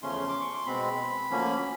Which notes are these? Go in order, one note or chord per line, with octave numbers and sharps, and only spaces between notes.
E2 C#3 F3 A3 C#4 C6
D6
C#6
C6
B2 G#3 C4 B5
D2 D3 F3 A#3 C#4